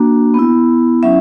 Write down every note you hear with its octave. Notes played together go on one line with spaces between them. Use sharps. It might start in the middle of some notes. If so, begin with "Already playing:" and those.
Already playing: A#3 D4 F#4
B3 E4
F#3 C#4 E4 E5